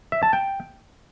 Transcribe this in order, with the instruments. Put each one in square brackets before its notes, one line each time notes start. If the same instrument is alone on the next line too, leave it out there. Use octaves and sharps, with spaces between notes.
[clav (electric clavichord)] E5
A5
G5